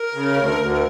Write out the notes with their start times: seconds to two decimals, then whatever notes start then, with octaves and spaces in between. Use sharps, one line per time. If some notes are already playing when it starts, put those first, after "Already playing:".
Already playing: A#4
0.14 C#3
0.37 D2
0.59 D2